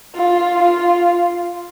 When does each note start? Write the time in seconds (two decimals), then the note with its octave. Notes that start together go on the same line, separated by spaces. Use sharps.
0.15 F4
0.62 F4